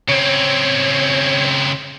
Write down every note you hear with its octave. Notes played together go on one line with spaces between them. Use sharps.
C#3 C4 C#5